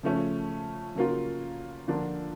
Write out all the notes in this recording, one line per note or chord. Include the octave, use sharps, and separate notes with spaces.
C#3 F3 A3 C#4
C#3 F#3 A#3 C#4 F4
D3 F3 A#3 D4 F4